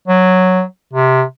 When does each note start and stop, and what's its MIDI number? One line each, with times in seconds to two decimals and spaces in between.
0.08 0.62 54
0.93 1.23 48